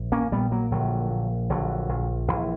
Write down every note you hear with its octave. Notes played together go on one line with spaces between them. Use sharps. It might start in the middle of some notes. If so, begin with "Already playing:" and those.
Already playing: A#1
A#3 C#4
A#2 G3 B3
F#3 A#3
A#1 D3 F#3
A#2
A#1 D3 F#3
A#1
A#1 E3